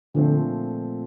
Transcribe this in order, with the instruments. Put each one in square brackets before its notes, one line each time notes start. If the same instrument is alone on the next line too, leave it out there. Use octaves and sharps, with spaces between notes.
[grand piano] A#2 F3 A3 C4 [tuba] D3